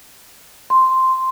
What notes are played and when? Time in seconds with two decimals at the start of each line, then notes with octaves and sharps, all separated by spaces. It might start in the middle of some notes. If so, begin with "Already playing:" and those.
0.70 C6